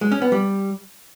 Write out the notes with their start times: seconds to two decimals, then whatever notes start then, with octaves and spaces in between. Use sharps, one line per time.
0.01 G#3
0.11 C#4
0.22 B3
0.32 G3